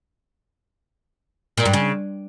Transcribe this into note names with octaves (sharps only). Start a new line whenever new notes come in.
A#2
G2
C#3